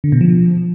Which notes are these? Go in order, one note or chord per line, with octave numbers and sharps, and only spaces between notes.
D3
B2
F3